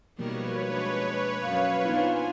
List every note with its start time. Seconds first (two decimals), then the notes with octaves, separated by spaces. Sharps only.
0.19 B2 D#3 F3 G3 A#3 A#4 B4 C#5
0.68 G#3 D4
1.43 F#2 F5
1.85 B3 C4 D4 D#4 F4 G#5